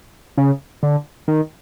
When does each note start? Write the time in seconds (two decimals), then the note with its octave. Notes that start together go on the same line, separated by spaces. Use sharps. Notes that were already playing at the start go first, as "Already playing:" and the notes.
0.37 C#3
0.83 D3
1.28 D#3